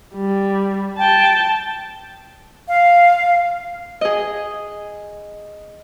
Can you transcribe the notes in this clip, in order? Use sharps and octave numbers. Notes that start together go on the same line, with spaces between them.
G3
G5 A5
F5
G#4 D#5